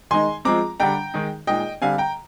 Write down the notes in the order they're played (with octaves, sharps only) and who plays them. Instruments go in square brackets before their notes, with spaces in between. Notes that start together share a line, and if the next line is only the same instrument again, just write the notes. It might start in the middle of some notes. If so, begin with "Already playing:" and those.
[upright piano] D#3 G#3 D#4 G#5 C6
F3 G#3 C4 A#5 D6
D3 G3 D4 G5 A#5
D#3 G#3 D#4
A#2 G#3 D#4 D#5 G5
D3 G3 C4 F5 G#5
G5 A#5